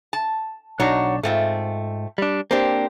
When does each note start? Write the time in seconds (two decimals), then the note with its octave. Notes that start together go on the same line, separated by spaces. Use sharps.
0.13 A5
0.80 B1 D4 D#4 F#4 C#5
1.23 G#2 A3 C4 F4
2.18 G3 D4
2.51 A#3 C4 D4 G4 C5